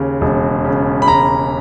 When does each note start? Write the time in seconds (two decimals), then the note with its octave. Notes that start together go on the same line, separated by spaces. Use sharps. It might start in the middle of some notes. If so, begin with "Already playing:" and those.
Already playing: D#2 C#3
0.21 E1
0.65 C#3
1.02 B5
1.08 E1 A#5